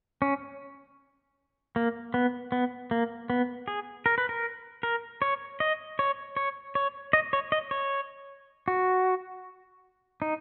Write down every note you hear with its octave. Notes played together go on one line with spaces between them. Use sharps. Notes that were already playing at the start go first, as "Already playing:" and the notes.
C#4
A#3
B3
B3
A#3
B3
G#4
A#4
B4
A#4
A#4
C#5
D#5
C#5
C#5
C#5
D#5
C#5
D#5
C#5
F#4
D#4